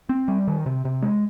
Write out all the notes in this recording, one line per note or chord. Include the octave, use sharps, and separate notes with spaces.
C4
G3
D#3
C3
C3
G#3